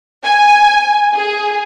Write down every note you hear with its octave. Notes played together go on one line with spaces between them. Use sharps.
G#5
G#4